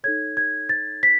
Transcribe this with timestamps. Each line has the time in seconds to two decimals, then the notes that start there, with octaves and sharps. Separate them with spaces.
0.04 D#4 A4 C#5 G#6
0.37 G#6
0.69 A6
1.03 B6